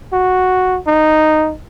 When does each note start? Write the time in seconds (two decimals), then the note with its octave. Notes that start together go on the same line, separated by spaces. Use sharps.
0.13 F#4
0.87 D#4